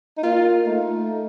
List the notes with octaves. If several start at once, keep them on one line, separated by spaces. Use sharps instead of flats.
D#4
A#3 F4
A3 D#4